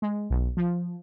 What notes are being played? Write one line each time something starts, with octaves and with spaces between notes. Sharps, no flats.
G#3
B1
F3